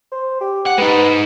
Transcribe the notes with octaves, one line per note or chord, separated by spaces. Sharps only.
C5
G4
F#5
G#3 D#4 B4